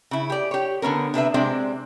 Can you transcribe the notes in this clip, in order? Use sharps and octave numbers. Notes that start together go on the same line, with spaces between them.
C#3 E4
G4 D5
G4 C#5
D3 B3 C#4 A#4
C3 D4 B4 E5
C3 G#3 C4 D4 D5